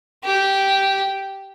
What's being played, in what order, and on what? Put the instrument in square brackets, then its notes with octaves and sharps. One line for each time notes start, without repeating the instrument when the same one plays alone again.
[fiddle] G4